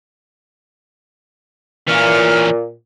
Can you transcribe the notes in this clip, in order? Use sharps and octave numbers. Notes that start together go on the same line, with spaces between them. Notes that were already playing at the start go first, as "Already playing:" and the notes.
A#2 E3 C#4 F6